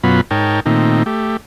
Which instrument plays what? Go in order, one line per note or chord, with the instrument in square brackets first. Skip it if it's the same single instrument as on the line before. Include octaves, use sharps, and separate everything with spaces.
[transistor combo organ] F#2 B2 F#3 B3 F4 B5
G#2 D#4 A#4 C#5 G5 A5
A#2 D#3 A3 C4 D#4
A3 G4